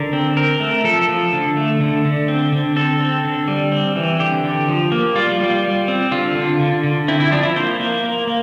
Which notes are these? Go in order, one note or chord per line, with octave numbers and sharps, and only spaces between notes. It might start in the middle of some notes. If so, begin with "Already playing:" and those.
Already playing: D3 A#4
C4
C4 A#4
A3
F3 A4
F3
D3
A3
D3
D3
C4
D3
C4 A4
C4
D3
G3
C4
E3
D3 G4
D3
F3
A#3
G3 F4
G3
G3
C4
D3 F4
D3
D3
D3
C4 E4
E4
F3 D4
E4
A#3 C5
A#3
A#3
A#3